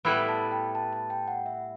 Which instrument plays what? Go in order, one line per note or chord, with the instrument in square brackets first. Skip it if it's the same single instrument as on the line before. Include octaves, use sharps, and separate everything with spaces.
[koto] A2 G3 B3 E4 B4 [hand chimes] E6
[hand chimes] A5
G5
A5
A5
G5
F#5
E5